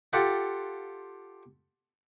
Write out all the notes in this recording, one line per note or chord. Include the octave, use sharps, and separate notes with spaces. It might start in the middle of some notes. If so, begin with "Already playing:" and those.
F4 G4 A4 F#5